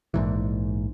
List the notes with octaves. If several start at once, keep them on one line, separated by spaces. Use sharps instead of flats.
A#1 G#2 E3